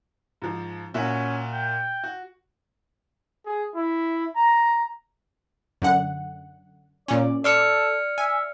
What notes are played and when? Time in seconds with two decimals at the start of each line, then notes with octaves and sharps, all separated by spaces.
0.42 G#2 F3
0.94 A#2 C#4 F#4 E5
1.53 G5
2.04 F#4
3.46 G#4
3.75 E4
4.36 A#5
5.82 F#2 D3 F#5
7.08 A#2 C#4 D5
7.44 A4 D5 C6 D6 E6 F6 C#7
8.18 E5 G#5